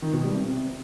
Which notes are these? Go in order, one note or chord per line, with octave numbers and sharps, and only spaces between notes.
D#3
B2
G3
C3
C3